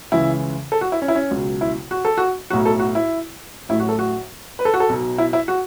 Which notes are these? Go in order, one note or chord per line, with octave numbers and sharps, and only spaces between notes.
C#2 C#3 E3 E4
A4
F#4
E4
C#4
E4
C#4
C#2 B2 F#3
E4
F#4
A4
F#4
B1 A2 F#3 F#4
A4
F#4
E4
A1 A2 F#3 E4
F#4
A4
F#4
B4
A4
F#4
A4
B1 B2 F#3
E4
E4
F#4